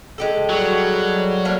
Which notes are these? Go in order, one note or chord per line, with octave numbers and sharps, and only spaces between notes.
G#3 G4 A4
F#3 G3
G3 A3 A#3 D4